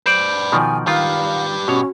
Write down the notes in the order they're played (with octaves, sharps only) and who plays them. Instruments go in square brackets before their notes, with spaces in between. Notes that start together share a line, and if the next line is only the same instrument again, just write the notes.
[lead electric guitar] B4 D5 [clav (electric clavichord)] C5 [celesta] G6 D7 F#7
[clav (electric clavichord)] B2 D#3 F3 [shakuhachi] G#5
[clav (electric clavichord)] D#3 F4 [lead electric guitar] G4 B4 [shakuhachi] F5
[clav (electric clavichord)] B2 C#5 [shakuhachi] C#4 [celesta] F#4